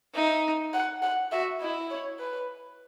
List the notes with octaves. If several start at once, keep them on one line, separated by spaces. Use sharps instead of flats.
D#4 E5
F#5
F#5
F#4 E5
E4 D#5
C#5
B4